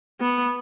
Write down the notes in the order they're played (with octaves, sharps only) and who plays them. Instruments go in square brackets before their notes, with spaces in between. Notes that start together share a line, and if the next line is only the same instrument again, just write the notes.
[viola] B3